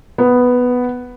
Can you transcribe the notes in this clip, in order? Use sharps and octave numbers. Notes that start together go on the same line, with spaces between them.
B3